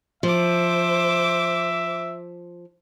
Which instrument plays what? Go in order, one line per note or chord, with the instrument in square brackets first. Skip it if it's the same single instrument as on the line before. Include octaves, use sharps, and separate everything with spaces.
[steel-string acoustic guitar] F3 [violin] C5 D6 [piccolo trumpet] E5